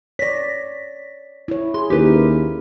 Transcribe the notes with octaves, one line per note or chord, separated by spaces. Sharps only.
C#5 D5 A#6 B6
E4 C#5
G#4 C6
D#2 C#4 E4 G4 A#4 B4